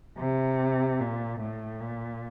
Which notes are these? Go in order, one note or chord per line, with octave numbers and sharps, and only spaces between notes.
C3
A#2
A2
A#2